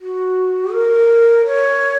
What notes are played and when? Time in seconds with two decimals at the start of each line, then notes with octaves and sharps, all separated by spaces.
0.01 F#4
0.73 A#4
1.46 C#5